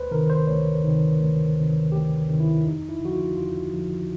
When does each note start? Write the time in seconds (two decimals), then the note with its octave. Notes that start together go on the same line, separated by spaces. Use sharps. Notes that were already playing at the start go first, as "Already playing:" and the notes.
Already playing: D2 B4 C5
0.11 C3 D#3 A#4
0.30 C5
0.47 D2 C#5
0.84 C3 D#3
1.20 D2
1.56 C3 D#3
1.92 D2 G4
2.28 C3 D#3
2.40 E4
2.64 F2 D#4
2.89 E4
3.00 D3 F3 F#4
3.13 F4
3.37 F2 F4
3.73 D3 F3